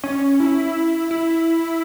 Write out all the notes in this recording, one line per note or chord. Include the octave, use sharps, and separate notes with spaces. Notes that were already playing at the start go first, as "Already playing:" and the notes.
C#4
E4
E4